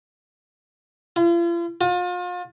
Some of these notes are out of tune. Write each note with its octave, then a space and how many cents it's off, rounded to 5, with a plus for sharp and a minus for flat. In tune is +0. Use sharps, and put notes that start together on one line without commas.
F4 -40
F4 +40